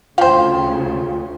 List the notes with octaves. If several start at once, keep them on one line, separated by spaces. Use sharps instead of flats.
D2 C#3 F3 F4 C5 F5 G5